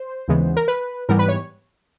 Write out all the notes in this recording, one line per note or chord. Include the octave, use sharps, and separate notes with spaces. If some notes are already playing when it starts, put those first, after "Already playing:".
Already playing: C5
D#2 C#3 E3 G#3 B3
A#4
B4
G#2 E3 G3 B3 A#4
B4
C#5